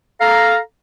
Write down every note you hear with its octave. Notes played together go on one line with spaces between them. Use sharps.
A4 F5 A#5